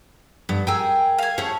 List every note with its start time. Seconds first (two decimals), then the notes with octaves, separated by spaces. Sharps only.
0.49 G2 B3
0.67 G#4 A#4 G5 G#5 E6
1.19 F5 G#5
1.38 A3 C#4 G#4 C#5